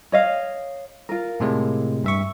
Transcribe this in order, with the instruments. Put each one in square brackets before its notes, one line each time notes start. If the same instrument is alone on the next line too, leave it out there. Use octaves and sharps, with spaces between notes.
[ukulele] C#5 D#5 F5
F4 A#4
[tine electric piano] A2 C3 G#3
G2 E5 C#6